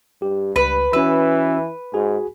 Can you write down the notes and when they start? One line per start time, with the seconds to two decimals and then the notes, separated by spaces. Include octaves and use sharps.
0.22 G2 G4
0.56 C#2 B4
0.93 E3 C#4 F#4 B4 E6
1.94 G#2 F#4 G#4 G#5